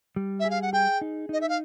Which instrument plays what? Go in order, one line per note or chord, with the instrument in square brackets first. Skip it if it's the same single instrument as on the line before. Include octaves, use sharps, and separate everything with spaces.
[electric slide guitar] G3
[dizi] E5
[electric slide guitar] G#4
[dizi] F5
F#5
[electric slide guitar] G#4 [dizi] G5
[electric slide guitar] D#4
[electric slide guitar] D#4 [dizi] D#5
[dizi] E5
F5